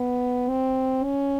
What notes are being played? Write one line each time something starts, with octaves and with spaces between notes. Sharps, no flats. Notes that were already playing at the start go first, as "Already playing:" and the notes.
Already playing: B3
C4
C#4